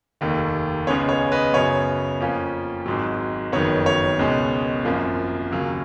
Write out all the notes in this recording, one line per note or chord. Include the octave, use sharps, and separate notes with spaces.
F1 D#2 D#3
C#2 C#3 G#3 B3 C#5
C#5
B4 D#5
F#2 C#3 F#3 B3 C#5
F2 F3 A#3 C#4
G#1 G#2 F#3
F#1 F2 D#3 F#3 B3 C#5
C#5
C#2 B2 G#3 B3
G#1 F#2 F3 A#3
D#2 C#3 F#3 A#3